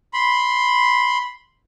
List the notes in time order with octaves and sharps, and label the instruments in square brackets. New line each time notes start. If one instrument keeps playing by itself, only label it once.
[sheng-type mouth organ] B5 C6